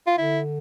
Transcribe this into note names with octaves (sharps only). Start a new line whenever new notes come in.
F4
D3 E4